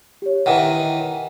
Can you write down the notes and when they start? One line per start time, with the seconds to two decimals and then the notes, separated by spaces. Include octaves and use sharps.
0.22 G4 C#5
0.46 D#3 E3 F#5 A#5